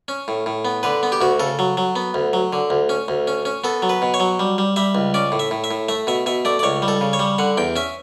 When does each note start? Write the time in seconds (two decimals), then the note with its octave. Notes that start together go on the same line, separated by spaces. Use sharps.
0.08 C#4
0.28 A2
0.46 A2
0.65 B3
0.83 D3 B4
1.03 B3
1.12 G4
1.21 D2 F#4
1.40 C#3 A4
1.59 F#3
1.77 F#3
1.96 B3
2.14 D2
2.33 F#3
2.53 D3
2.70 D2
2.89 C#4
3.08 D2
3.27 C#4
3.45 C#4
3.64 B3 A4
3.82 F#3
3.89 B4
4.02 B2
4.14 C#5
4.20 F#3
4.39 G3
4.58 G3
4.76 G3 E5
4.95 C#2
5.14 C#4 D5
5.32 A2
5.39 E5
5.51 A2
5.64 E5
5.71 A2
5.89 A3 E5
6.07 B2 E5
6.26 B2 E5
6.45 A3 D5
6.59 D5
6.63 C#2 C#5
6.82 G3
6.88 A4
7.01 C#3
7.13 C#5
7.19 G3
7.38 D3 F#5
7.57 E2 G5
7.76 C#4 E5